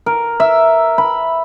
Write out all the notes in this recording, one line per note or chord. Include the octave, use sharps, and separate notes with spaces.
A#4
E5
B5